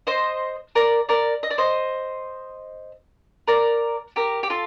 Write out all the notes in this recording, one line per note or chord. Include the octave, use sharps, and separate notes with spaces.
C5 D#5
A#4 D5
A#4 D5
D#5
D5
C5 D#5
A#4 D5
G4 A#4
G4
F4 A4